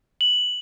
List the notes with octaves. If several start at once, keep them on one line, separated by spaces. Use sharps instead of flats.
F#7